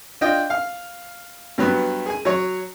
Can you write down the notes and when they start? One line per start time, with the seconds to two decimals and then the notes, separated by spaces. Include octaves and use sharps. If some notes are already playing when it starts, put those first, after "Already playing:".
0.21 D4 F4 D#5 G5
0.50 F5
1.58 G2 F#3 B3
2.06 G#4 G#5
2.25 F#3 C#5